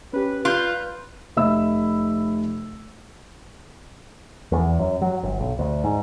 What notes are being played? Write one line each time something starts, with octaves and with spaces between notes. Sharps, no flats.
C#4 G4 B4
F4 B4 F#6 G6
F1 D#5 E5 B5 E6
E2
F#2
F#3
G1
B1
D2
G#2